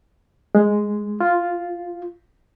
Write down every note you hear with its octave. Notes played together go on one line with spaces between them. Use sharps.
G#3
F4